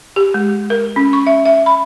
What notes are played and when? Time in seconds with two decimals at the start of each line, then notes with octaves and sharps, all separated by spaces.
0.16 G4
0.34 G#3
0.70 A#4
0.96 C#4
1.13 C#6
1.27 E5
1.46 E5
1.66 B5